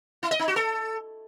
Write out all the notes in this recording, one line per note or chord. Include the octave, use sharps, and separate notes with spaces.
E4
D#5
D#4
F#4
A4